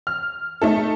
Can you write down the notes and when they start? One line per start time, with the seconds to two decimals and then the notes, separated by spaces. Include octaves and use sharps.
0.07 F6
0.62 A3 D#4 A4